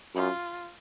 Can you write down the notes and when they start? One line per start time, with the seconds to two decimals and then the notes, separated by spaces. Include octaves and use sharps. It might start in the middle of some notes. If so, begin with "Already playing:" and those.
0.15 F#2 F4